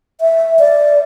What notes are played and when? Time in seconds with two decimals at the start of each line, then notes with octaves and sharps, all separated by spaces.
0.21 E5
0.59 D5